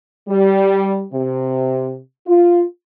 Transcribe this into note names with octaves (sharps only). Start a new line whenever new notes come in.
G3
C3
F4